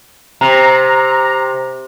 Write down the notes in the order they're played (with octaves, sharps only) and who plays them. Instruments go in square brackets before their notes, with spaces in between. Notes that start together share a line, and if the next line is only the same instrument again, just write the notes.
[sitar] C3 [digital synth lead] A#5